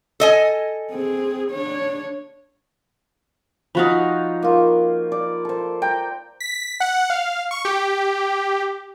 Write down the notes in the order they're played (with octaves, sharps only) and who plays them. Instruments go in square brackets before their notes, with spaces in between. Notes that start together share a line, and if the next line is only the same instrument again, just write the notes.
[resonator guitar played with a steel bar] A4 D#5 G#5
[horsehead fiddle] C4 G#4
D4 C#5
[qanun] F3 F#4 F5 [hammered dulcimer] D#4 F#5 B5
[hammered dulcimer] A#3 F4
D5
A4 C5
G5 A#5
[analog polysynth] B6
F#5
F5
C#6
G4